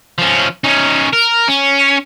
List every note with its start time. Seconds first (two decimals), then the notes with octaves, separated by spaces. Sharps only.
0.18 F3 C#4
0.64 C#4 D#4
1.13 A#4
1.48 C#4